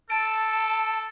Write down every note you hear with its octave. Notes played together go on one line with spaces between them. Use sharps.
A4 A5 A6 D7